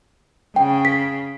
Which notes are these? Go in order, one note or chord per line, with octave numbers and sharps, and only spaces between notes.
C#3 G5
B6